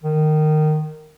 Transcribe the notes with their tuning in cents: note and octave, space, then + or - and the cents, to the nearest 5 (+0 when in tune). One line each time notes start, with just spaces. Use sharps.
D#3 -15